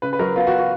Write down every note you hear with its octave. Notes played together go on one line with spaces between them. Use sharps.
C#3 B4
B4
F#3 A#4
B3 F4
F#4
F#4